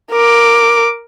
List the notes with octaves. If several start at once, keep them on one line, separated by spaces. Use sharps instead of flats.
A#4 D6